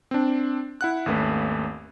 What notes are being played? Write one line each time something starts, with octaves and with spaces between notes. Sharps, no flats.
C4 D4
E4 F#5 F#6
G#1 D#2 A3 C#4 B4